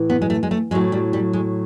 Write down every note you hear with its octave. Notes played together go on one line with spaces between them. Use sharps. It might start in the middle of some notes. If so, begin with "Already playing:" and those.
Already playing: A2 E3
B3
G#3
A3
G#3
A3
A2 F#3 G#3
G3
G3
G#3